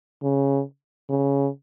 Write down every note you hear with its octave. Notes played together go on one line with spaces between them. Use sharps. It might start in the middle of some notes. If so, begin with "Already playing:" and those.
C#3
C#3